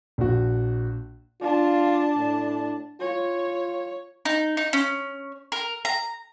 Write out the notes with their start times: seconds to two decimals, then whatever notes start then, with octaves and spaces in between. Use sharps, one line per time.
0.18 A#1 F#4
1.41 D4 F4 A5
2.17 A2
3.01 F4 C#5
4.25 D#4
4.57 D#4
4.73 C#4
5.52 A#4
5.85 A#5